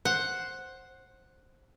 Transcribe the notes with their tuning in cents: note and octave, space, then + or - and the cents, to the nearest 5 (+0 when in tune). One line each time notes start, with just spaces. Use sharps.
C5 +10 F#5 +0